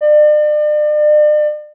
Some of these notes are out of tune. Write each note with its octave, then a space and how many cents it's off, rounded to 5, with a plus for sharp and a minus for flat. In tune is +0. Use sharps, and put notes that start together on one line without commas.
D5 +40